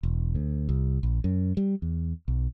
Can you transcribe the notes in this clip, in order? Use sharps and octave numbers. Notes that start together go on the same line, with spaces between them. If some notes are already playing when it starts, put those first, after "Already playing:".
E1
D2
C2
A#1
F#2
G3
E2
B1